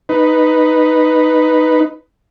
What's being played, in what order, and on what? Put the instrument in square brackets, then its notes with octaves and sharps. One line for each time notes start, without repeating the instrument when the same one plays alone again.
[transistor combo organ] D#4 B4